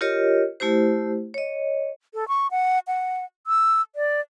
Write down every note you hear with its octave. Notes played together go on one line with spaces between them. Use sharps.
F4 G4 A#4 C#5 D#5
A3 E4 G4 C5
C#5 D#5
A4
C#6
F#5
F#5
E6
D5